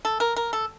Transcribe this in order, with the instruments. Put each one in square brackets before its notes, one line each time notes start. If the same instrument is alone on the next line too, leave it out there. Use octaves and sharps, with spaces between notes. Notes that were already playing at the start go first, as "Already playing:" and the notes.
[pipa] A4
A#4
A#4
A4